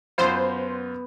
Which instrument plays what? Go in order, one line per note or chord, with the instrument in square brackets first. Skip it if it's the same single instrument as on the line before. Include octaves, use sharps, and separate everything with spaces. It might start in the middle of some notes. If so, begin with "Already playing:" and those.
[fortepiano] F#2 F4 [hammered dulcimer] B3 B4 B5 [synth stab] C5